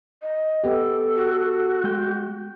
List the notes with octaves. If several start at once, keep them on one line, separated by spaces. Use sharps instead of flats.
D#5
B3 G4 A4
F#4
G#3 G5